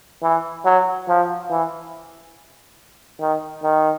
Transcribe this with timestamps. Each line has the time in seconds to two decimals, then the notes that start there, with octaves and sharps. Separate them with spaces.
0.23 E3
0.65 F#3
1.09 F3
1.51 E3
3.21 D#3
3.64 D#3